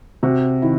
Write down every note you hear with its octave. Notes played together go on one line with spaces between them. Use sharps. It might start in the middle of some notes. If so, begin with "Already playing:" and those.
C3 F#4
D#3 E4